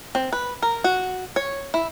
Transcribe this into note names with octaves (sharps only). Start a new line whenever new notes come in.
C4
B4
A#4
F#4
C#5
E4